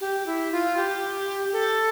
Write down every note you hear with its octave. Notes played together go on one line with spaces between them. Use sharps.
G4
E4
F4
G4
A4